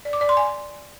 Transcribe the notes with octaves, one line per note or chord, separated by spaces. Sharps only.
D5
D6
D5
C6
G#5